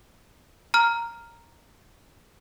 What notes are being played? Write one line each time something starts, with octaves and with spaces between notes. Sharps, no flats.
A#5 F6